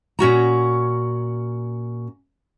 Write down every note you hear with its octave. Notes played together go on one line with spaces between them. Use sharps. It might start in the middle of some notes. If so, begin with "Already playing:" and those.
A#2 C#4 F#4 A#5